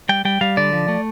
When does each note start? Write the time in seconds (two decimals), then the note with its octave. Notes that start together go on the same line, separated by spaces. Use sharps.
0.09 G3 G5
0.25 G3 G5
0.41 G3 F5
0.57 D3 D5
0.73 F3
0.88 A3